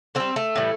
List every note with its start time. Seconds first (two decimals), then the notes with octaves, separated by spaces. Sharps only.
0.15 D3 G3 C4
0.36 A3
0.55 A2 E3 G3